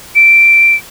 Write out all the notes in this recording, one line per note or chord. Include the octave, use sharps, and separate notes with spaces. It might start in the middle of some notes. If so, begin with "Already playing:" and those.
D7